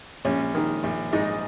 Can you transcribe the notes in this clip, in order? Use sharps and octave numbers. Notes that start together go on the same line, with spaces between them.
A#1 C#4
D#3
A#1
G#2 D#4